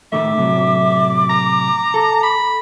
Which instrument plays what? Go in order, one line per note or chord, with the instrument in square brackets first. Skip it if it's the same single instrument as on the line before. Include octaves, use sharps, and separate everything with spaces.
[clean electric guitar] A2 D#3 A3 [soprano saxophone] E5 [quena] D6
[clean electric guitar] A2 C3 F#3
[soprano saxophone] A#5
[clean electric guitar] A4
[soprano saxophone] B5